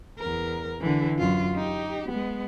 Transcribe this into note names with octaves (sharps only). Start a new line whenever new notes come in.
E2 A#4
D3 E3
F#2 F4
D#4 G4
G#3 B3